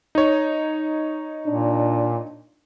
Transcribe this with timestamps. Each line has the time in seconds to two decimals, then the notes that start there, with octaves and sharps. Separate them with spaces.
0.15 D#4 C#5
1.47 A#2 D4